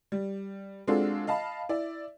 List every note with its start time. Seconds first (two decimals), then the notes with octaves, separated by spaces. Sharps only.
0.12 G3
0.87 G#3 C4 D4 F4 F#4 A4
1.27 D#5 F5 A5 B5
1.69 E4 D5